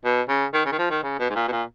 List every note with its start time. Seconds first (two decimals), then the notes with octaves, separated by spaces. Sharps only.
0.04 B2
0.28 C#3
0.53 D#3
0.65 C#3
0.72 D#3
0.78 F3
0.90 D#3
1.03 C#3
1.19 B2
1.30 G#2
1.35 A#2
1.47 B2
1.51 A#2